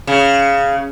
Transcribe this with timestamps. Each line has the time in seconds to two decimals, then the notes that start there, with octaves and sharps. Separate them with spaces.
0.07 C#3